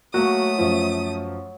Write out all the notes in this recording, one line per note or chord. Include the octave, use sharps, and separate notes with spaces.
F#3 A3 A#3 F#4 D#6
F#2 F3